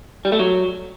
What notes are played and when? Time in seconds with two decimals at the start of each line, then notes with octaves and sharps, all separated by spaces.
0.25 G3
0.32 A3
0.39 F#3